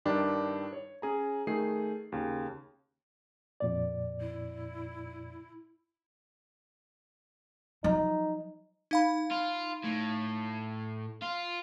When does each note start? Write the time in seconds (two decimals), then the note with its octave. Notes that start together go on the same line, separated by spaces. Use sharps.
0.05 G2 D#3 D4 E4 G4
0.73 C#5
1.02 C#4 G#4 A#5
1.47 D#3 A3 G#4 C7
2.12 D#2 C#3
3.60 F2 A#2 D5
4.20 E4
7.84 F3 F#3 D#4
8.91 D#4 F5 B5
9.31 F4
9.84 A2
11.22 F4